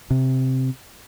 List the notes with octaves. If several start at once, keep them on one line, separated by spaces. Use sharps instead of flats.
C3